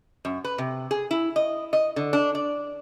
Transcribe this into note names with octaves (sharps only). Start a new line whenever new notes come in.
F#2
B4
C3
G#4
E4
D#5
D#5
D3
D4
D5